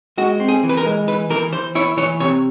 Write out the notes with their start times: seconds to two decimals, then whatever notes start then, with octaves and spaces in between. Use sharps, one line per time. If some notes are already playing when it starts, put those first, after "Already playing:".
0.18 G#3 F#4
0.40 C4
0.48 G#4
0.63 E3
0.69 B4
0.77 A#4
0.86 G#3
1.07 E3 B4
1.30 E3 A#4
1.52 E3 C5
1.75 E4 C#5
1.97 E3 C#5
2.20 C3 C#5